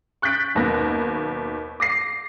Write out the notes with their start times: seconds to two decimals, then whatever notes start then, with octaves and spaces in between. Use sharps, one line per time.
0.22 C#6 F#6 G6 A6 B6 D7
0.55 F#1 D#2 B2 A#3 A#6
1.80 D6 A#6 C7